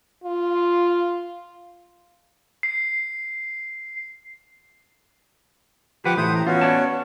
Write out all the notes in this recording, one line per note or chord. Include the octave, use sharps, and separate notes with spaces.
F4
C7
F3 G4 B4 F#5 D6
A2 E3 C5 D#6
A#5
B3 C#4 F4 F#4
C#5 D5 A5